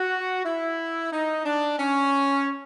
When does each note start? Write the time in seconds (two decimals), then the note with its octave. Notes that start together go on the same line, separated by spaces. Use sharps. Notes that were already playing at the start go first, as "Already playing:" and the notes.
Already playing: F#4
0.45 E4
1.13 D#4
1.45 D4
1.79 C#4